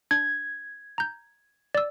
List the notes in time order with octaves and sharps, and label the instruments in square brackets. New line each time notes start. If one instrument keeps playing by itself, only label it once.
[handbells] D4 [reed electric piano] G#6
[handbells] A#5 G6
D5 E6